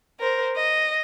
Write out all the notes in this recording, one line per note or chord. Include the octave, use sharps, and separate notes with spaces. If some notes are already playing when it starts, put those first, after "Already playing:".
A#4 C5
D#5